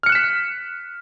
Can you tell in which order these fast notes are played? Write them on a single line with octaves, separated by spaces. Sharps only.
F6 C#7 F#6 E7 B6